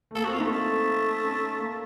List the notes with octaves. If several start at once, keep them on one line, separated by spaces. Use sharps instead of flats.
A3
A#3 A4
C4 F#4
F4
A3 D#4
A3
C#4
A#3